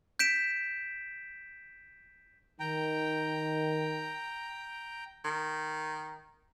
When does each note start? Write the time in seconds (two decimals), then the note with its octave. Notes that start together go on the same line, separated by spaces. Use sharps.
0.19 G6 B6 D7 E7
2.60 D#3 G5 A#5
5.25 D#3